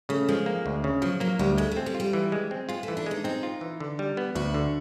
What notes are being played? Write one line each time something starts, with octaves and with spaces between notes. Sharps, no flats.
C#3 A3
F3 G#3
A#3
D2
C#3
F3 F#3
F#3 A#3
D2 G3
G#3 A3
A3
C4
G3
F4
G3
E3
G#3
C4
G#3 F4
A3
E3
D4
G#3 D#4
C4 D#4
F4
E3
D3
G3
B3
D2 F#4
D3